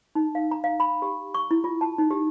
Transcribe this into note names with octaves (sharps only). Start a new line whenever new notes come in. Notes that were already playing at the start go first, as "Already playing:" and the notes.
D#4
F5
A#5
F5
B5
G4
C#6
E4
F4
A5
D#4
G4